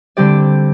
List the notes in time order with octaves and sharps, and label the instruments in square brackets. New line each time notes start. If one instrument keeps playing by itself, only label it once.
[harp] D3 G3 C4 G4 D5